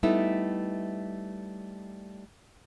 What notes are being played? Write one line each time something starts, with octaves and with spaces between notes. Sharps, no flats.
G3 A3 B3 D#4 E4